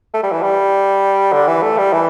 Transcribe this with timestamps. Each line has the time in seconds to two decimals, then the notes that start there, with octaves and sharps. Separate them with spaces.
0.14 A3
0.23 G3
0.32 E3
0.43 G3
1.32 D3
1.47 E3
1.62 A3
1.78 G3
1.93 E3